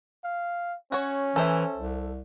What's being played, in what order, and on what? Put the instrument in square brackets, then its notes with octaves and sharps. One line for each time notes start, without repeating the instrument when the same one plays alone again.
[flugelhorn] F5
[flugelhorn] C#4 [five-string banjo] F#4 C#5
[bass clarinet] E3 [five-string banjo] A4 C5 E5
[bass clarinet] C2